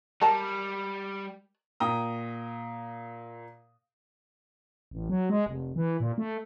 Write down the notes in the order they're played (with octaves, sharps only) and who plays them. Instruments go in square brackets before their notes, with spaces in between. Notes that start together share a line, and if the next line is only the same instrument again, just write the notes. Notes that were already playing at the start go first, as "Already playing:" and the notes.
[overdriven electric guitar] G3 [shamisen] A#4 A5
[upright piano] A#2 G5 A#5 D#6
[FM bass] A1
F#3
G#3
F1
E3
A#2
A3